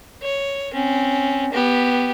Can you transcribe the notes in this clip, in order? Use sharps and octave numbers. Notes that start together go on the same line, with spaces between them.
C#5
C4 C#4
B3 G4